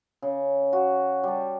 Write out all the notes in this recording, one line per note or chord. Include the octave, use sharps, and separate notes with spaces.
C#3
F#4
G3 A5